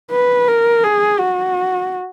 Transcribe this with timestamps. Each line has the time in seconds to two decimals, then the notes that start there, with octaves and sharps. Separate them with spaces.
0.11 B4
0.48 A#4
0.83 G#4
1.19 F#4